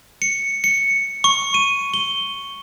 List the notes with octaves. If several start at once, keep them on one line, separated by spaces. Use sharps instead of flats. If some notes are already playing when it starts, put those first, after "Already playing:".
C#7
C#7
C#6
D#7
G7